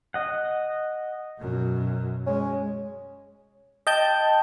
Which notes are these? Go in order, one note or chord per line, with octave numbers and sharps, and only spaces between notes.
D#5 F#5
F#2 B2
G#3 C#4
D#5 G5 A5 G6